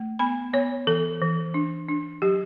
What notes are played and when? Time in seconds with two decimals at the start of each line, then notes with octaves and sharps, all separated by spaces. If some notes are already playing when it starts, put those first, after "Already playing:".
Already playing: A3
0.19 B3 B5
0.53 B3 C#5
0.87 E3 A4
1.21 E3
1.54 D4
1.89 D4
2.22 F#3 G4